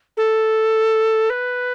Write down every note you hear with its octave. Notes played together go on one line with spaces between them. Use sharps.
A4
B4